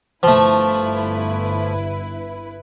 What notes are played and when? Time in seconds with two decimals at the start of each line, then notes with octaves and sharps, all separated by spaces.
0.23 G1 F3 A3 E4 B4